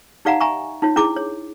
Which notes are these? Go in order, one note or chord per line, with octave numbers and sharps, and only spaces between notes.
D#4 G4 D5 F5 F#5 A#5
E5 G#5 A#5 C#6
D#4 F4 C#5
D4 E4 G#4 D6
C#5